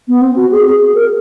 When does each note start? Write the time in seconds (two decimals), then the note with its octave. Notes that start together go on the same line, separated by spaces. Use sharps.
0.08 B3
0.21 C4
0.36 F#4
0.51 G#4
0.66 G#4
0.95 A#4